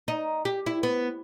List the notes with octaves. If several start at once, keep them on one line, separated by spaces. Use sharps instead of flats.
D#4
G4
E4
B3